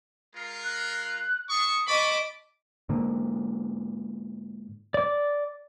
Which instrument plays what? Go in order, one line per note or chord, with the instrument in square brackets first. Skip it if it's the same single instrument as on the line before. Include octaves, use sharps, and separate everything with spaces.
[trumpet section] G#3 F4 A#4
[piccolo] F#6
[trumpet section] D4 C#6 [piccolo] D#6
[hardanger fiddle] D#5 D6 [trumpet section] A5 B5 [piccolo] C#6
[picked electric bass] G#2 D3 A#3
[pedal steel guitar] D5 D6